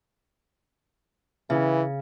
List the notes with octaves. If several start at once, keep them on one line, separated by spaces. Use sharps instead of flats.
C#3 E3